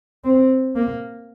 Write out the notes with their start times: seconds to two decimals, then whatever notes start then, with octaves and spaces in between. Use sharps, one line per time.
0.24 C4
0.76 A#3